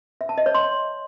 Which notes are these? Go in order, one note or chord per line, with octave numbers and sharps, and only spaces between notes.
E5
A5
D#5
C#5
C6